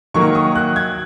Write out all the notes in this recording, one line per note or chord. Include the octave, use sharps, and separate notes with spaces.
D#3 F#3 A#3 C#6
D#6
F#6
G#6